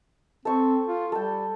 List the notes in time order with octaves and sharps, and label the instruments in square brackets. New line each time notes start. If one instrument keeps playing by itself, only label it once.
[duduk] C4 [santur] A4 C5 C#6
[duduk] F4
[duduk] G3 [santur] A4 G5